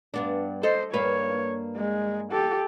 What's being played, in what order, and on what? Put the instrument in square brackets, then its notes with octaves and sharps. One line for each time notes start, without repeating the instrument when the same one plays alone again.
[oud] G2 B3 D4
[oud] A4 D#5 [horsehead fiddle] C5
[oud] G2 A#3 B4 [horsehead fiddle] C#5
[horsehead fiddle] G#3
G4 A4